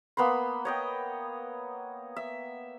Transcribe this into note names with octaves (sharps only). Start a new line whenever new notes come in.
A#3 B3 B5 C6
C#5 D#5 G5
E5